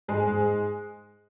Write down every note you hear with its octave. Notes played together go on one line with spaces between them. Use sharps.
G#2 G#3
G#2